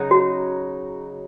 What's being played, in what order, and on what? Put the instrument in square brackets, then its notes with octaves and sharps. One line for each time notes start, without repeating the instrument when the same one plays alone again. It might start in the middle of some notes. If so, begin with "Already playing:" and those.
Already playing: [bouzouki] C#3 F#3 D#4
[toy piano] F#4